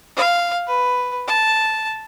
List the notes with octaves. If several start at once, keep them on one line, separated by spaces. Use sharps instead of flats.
F5
B4
A5